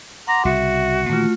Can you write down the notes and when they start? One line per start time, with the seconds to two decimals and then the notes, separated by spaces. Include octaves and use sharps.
0.27 F#5 A#5 C6 D6
0.45 C2 C#3 F#4 E5
1.09 A#2 D#3 E3 A3 F4